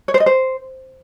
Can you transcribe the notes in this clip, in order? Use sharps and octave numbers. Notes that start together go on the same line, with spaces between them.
C#5
C5
D#5
C5